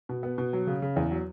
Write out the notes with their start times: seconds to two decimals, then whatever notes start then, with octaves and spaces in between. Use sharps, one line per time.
0.09 B2
0.23 B3
0.38 B2
0.53 F#3
0.67 C#3
0.82 C#3
0.96 E2
1.11 F#3